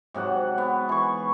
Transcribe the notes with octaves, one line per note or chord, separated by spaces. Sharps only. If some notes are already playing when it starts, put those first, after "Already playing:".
G#2 C3 F#3 F#5
B3
E3 C#6